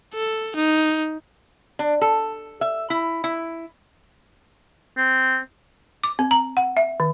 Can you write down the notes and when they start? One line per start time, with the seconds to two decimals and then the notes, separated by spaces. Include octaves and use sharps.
0.14 A4
0.56 D#4
1.79 D4
2.01 A4
2.61 E5
2.90 E4
3.24 E4
4.97 C4
6.04 D6
6.19 C4
6.31 A#5
6.57 F#5
6.77 E5
7.00 D#3